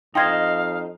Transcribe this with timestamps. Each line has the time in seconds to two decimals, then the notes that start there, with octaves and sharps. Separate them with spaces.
0.15 F2 D#4 C5 D#5 F5 G5 C6 G#6